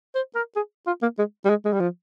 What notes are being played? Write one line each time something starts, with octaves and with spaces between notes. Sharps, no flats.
C5
A#4
G#4
F4
A#3
G#3
G3
G#3
G#3
G3
F3